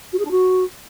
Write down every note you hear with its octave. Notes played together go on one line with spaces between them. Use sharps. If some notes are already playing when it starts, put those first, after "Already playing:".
F#4
G#4
D4
F#4